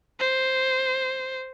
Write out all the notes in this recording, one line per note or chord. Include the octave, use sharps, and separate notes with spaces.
C5